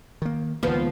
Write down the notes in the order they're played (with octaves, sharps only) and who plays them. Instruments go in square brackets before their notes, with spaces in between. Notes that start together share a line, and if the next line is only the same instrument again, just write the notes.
[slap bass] D#3 A#3
[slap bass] C#2 D#3 A#3 [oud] F3 B3